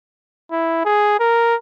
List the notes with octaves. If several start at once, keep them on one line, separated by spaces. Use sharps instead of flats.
E4
G#4
A#4